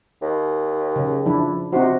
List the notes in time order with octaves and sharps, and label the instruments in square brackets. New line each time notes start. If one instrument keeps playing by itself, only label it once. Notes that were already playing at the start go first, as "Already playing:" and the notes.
[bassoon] D#2
[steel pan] C#3
F3 D4 E4
[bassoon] C3 [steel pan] C4 D#4 F#4